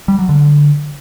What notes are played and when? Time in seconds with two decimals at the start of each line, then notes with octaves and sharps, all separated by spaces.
0.08 G3
0.19 F#3
0.29 D3